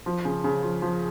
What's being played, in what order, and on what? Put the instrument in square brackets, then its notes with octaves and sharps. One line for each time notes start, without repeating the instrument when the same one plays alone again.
[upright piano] F3
C#3
C#3
F3
F3